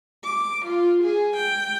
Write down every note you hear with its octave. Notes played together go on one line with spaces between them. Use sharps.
D6
F4
G#4
G5